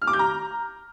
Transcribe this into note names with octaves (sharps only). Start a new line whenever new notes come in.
F6
D6
G6
A#5